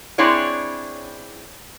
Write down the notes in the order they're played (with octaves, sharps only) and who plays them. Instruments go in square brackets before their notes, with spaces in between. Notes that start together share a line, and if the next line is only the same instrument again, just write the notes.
[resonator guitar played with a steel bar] C4 D4 E4 G#4 C#5 D5